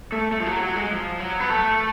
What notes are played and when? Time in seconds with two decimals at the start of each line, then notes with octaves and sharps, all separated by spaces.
0.12 A3
0.32 A3
0.40 F3
0.46 F#3
0.61 F#3
0.76 G#3
0.91 F3
1.20 F#3
1.40 B3
1.50 A3